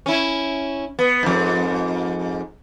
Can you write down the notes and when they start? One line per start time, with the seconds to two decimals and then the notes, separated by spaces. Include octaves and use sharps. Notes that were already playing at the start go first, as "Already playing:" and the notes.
0.06 C#4 E4
0.99 B3
1.23 F2 G#2